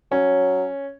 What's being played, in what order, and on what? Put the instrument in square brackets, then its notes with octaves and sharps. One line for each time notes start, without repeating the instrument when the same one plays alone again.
[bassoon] F#3 [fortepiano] C#4